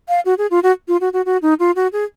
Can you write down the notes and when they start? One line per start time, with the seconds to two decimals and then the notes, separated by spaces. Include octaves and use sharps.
0.09 F5
0.25 F#4
0.38 G#4
0.51 F4
0.63 F#4
0.88 F4
1.01 F#4
1.13 F#4
1.26 F#4
1.42 D#4
1.60 F4
1.76 F#4
1.93 G#4